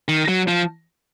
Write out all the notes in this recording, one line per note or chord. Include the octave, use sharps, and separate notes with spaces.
D#3
F#3
F3